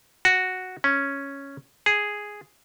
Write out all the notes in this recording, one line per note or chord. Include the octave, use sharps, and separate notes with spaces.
F#4
C#4
G#4